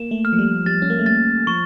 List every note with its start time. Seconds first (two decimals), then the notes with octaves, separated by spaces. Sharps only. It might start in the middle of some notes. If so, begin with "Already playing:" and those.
Already playing: A#3 E7
0.11 A3
0.25 F6
0.33 F3
0.39 G3
0.66 G3 A6
0.82 C#4
0.90 A#3
0.99 A3
1.06 G3 A6
1.47 F3 C#6